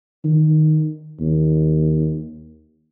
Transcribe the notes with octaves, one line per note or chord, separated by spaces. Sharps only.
D#3
D#2